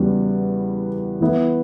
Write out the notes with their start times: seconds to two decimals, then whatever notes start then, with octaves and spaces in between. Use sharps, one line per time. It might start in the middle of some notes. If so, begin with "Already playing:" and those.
Already playing: E2 C#3 G3 B3 F#4
1.21 E3 B3 E4